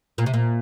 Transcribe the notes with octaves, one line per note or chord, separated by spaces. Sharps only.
A#2
C3
A#2